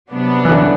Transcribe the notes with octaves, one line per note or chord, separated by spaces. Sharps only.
C3 F#3 B3 D4
E3
D3